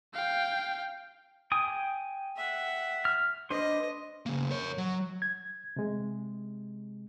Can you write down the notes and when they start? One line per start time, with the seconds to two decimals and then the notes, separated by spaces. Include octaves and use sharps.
0.14 F5 G5
1.52 G5 G#5 D#6
2.37 E5 F#5
3.05 F6
3.51 D4 B4 C5 D#5
4.26 C#3 A#3
4.51 A#4 C#5
4.78 F#3
5.22 G#6
5.76 C3 G#3